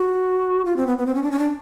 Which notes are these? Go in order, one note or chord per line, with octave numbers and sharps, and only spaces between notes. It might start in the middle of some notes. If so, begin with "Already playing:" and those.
Already playing: F#4
F4
C4
B3
B3
C4
C#4
D4
C#4
D4